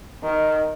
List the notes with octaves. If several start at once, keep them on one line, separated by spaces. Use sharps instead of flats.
D#3